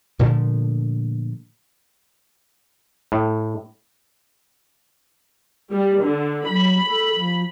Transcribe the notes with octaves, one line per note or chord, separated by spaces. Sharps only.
A#2 D3 F3 A3
A2
G3
D3
F#3 B5
A4
F3